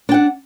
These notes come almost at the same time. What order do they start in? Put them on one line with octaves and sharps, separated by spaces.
D4 G5 F#5